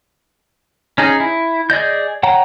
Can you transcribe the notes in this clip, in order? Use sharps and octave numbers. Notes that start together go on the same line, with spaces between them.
C#4 D#4 G#4
E4
G#4 D5 D#5 G6
C#5 F#5 G5 A#5